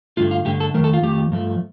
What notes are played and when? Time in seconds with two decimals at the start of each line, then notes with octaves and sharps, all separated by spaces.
0.17 G2 D3 A3 F4
0.31 F4
0.45 G2 D3 A3 G4
0.60 A4
0.74 F2 D#3 A3 A#4
0.84 A4
0.93 F4
1.03 F2 D#3 A3 G4
1.32 G2 F3 A3